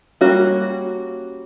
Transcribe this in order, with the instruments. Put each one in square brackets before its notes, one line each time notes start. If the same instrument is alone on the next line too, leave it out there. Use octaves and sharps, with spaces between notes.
[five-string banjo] G3 A#3 C#4 F#4